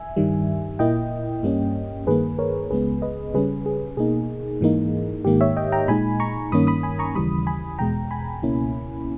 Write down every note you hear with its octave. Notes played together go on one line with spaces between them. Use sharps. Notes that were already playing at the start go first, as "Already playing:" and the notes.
Already playing: E5 G#5
G2 D#3 G3
A#2 A#3 E4 D#5 G5
G2 G3 A#3 C#4
G2 D#3 A#3 G#4 B4
A#4 C#5
C#2 C#3 G#3 B3 G#4 B4
B4 D#5
C#3 G3 C#4 G#4 B4
G#4
B2 A#3 D#4 G#4
G#2 E3 A#3 D#4
G#2 D#3 A#3 G4
C#5 E5
D#5 G5
G5 A#5
A#2 G#3 D#4 G#5 B5
A#5 C#6
G2 D#3 A#3 C#4 B5 D#6
B5 D#6
G#5 B5
A#5 C#6
D#2 C#3 E3 G3 B5 D#6
G#5 B5
E2 B2 G#3 G5 A#5
G#5 B5
C#2 B2 A#3 C#4 E4